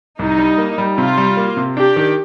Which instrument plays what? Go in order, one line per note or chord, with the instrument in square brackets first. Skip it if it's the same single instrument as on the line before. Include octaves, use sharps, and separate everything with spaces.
[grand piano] C2 [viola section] D#4
[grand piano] G3
A#3
G3
[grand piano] C3 [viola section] F4
[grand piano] G3
A#3
C3
[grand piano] D4 [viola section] G4
[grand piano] D#3